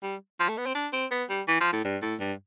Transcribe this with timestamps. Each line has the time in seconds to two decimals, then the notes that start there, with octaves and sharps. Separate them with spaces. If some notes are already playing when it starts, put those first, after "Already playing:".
0.03 G3
0.40 F3
0.49 A3
0.58 B3
0.66 C4
0.75 D4
0.93 C4
1.11 B3
1.29 G3
1.48 E3
1.61 F3
1.73 A2
1.85 G2
2.02 A2
2.20 G2